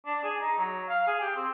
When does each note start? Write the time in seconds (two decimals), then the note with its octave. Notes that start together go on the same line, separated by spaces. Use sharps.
0.06 D4
0.24 G#4
0.40 D#4
0.58 F#3
0.89 F5
1.07 G#4
1.21 G4
1.36 C4